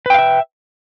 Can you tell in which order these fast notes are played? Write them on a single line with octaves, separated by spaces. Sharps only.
B4 G5 F5 E5